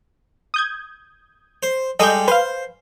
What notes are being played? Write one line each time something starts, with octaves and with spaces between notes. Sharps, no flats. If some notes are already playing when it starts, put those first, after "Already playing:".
D#6 G6 G#6
C5
G3 G#3 A4 D#5 G6
B4 C5 F5